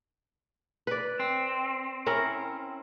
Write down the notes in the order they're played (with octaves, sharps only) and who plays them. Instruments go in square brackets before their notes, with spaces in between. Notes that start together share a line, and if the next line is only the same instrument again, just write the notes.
[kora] B4 D5
[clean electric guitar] C4
[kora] C#4 E4 A#4